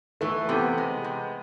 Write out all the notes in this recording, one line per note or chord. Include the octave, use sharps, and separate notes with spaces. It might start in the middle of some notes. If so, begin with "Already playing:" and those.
E3 A3
C3 B3
G#3
C3